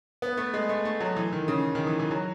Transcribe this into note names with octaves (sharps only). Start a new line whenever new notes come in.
B3
A3
G#3
A3
A3
F#3
E3
D#3
C#3
D#3
E3
E3
F#3